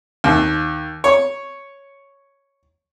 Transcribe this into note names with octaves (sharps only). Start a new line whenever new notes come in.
D#2
C#5